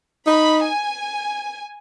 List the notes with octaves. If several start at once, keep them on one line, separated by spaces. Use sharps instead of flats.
D#4 B5
G#5